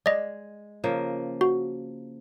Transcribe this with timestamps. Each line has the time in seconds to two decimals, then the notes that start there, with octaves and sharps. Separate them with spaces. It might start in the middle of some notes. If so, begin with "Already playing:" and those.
0.06 G#3 D5 D#5
0.84 C#3 F3 A#3
1.41 F#4